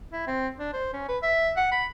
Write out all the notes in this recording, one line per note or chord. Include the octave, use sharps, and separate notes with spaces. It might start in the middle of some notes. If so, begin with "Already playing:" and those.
E4
C4
D4
C5
C#4
B4
E5
F#5
B5